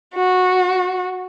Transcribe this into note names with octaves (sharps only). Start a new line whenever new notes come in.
F#4